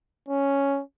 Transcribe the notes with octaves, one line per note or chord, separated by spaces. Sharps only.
C#4